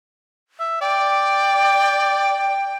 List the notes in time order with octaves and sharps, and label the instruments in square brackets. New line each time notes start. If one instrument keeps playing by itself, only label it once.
[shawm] E5
[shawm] D5 [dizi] G5